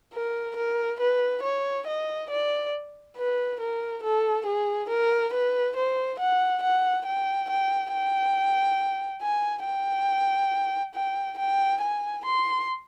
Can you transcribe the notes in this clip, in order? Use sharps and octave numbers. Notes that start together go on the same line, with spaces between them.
A#4
A#4
B4
C#5
D#5
D5
B4
A#4
A4
G#4
A#4
B4
C5
F#5
F#5
G5
G5
G5
G#5
G5
G5
G5
G#5
C6